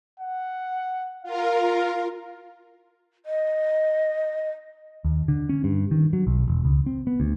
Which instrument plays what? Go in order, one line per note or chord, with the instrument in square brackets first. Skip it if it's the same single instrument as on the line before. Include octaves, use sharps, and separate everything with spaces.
[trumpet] F#5
[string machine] F4 A#4 [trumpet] F5
[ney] D#5
[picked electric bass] D#2
D3
C#4
G2
D#3
F#3
B1
E1
C#2
C4
B3
D2